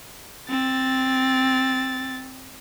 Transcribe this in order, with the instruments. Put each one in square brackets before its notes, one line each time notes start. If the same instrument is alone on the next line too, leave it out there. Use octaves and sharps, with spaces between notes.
[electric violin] C4 A6